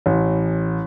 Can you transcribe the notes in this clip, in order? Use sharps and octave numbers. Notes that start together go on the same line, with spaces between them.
A1